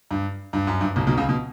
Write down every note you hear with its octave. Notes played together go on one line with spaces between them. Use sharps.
G2
G2
F#2
G2
B1 B2
B1 B2
C#2 C#3
B2